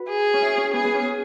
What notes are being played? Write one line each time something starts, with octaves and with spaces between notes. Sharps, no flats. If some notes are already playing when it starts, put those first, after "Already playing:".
Already playing: F#4 B4
G#4
C#4
E4
C#4
B3 G#4
B3
C#4